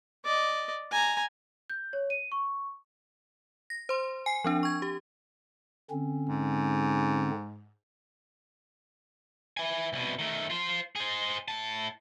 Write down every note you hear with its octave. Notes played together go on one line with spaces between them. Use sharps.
D5 D#5
G#5 A#5
G6
C#5
D#7
C#6
A#6
C5 C6
G#5 C7
F3 C4 D4
C#6 G#6
G4
D3 C4 C#4
G#2
E4 G#5
C2 B2
D#3 A3
F4 C5
G#4 C5
A2 A5